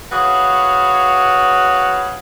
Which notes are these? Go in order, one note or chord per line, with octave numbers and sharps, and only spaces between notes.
F#4 G#4 B4 C#5 F5